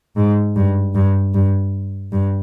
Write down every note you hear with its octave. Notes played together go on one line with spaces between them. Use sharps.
G#2
G2
G2
G2
G2